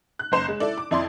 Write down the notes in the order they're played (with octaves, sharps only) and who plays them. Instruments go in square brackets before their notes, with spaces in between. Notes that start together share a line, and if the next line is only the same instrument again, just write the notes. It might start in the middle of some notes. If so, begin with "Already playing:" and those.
[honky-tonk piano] F#6
F#1 C5 E7
G#3
E4 A4 D5
D6
F2 E4 D5 C6